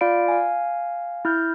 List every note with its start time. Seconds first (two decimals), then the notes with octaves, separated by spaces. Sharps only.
0.01 F4 D5 F5 B5 D7
0.28 F5 G#5
1.25 E4 F6 G6